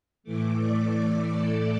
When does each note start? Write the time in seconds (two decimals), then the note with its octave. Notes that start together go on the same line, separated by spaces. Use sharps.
0.23 A2 E3 A3 D6
0.59 D5
1.30 A4